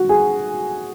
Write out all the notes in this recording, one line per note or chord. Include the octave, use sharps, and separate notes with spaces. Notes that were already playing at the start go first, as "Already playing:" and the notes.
Already playing: F#4
G#4